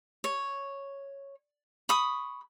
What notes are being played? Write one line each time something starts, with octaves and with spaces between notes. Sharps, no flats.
C#5
B5 C#6 D#6